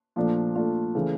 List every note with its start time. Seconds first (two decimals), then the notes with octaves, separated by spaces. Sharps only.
0.16 A#2 F3 A3 D4 F4
0.55 A#2 F3 A3 D4 F4
0.95 C#3 E3 A3